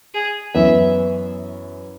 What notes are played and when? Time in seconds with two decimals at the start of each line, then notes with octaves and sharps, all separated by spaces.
0.14 G#4
0.54 F#2 E3 B3 E5